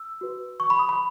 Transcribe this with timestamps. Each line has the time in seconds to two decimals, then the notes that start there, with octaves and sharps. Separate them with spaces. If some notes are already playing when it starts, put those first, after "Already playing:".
Already playing: E6
0.21 F#4 B4
0.60 C#6
0.70 B5
0.79 D#6
0.89 B5